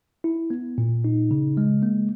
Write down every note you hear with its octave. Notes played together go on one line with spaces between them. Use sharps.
E4
B3
A#2
D#4
C#3
G#3
A#3